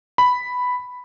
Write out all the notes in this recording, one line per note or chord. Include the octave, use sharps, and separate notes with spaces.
B5